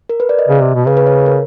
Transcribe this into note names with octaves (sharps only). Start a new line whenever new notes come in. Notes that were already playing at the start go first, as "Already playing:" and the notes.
A#4
B4
D5
D#5
C#3
C3
B2
C#3 B4
B4
C#5
A#4